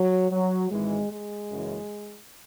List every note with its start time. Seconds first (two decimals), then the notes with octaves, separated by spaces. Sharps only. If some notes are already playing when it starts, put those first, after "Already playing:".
Already playing: F#3
0.31 F#3
0.71 G#1 G#2 E3 G#3
1.11 G#3
1.51 F#1 F#2 C#3 E3